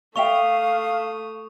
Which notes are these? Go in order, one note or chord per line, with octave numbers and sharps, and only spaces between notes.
A3 D5 E5 F5 G5 C#6 D#6 F7